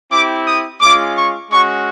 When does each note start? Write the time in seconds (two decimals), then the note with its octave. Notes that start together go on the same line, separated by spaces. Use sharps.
0.11 C4 E4 G4 D6
0.46 D#6
0.81 G#3 C#4 F4 D6
1.16 C#6
1.51 G#3 C#4 F#4 C#6